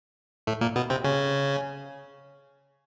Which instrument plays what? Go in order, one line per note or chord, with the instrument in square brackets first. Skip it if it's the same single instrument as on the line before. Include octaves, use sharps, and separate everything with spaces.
[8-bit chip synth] A2 A3
A#2 A#3
B2 B3
C3 C4
C#3 C#4